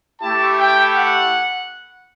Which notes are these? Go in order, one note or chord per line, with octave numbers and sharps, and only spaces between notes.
A3 E4 G4 A5
G5
F#5